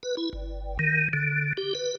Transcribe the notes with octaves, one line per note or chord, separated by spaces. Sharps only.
B4
E4
G1
D#3
D3
G4
B4